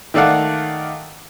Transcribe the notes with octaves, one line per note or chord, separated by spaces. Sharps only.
D#3 A3 D5 F5 F#5